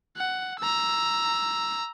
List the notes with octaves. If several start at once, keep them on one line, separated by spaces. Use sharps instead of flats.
F#5
A#5 E6